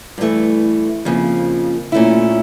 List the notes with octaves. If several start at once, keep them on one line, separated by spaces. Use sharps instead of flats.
G2 E3 A3
F2 C#3 F3 A#3
A#2 A3 C#4 E4